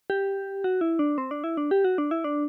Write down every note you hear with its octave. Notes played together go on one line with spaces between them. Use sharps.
G4
F#4
E4
D4
C4
D4
E4
D4
G4
F#4
D4
E4
D4